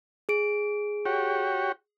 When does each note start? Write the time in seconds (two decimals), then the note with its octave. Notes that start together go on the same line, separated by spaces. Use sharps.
0.29 G#4 D7
1.05 F#4 G4 C#5